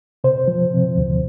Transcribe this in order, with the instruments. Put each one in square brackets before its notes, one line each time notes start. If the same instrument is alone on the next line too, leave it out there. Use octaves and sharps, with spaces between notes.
[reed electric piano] C3 C5
F3
C3
D2